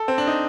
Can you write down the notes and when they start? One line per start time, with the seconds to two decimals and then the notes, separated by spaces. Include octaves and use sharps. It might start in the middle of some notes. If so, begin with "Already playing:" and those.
Already playing: A4
0.08 C4
0.18 D4
0.27 D#4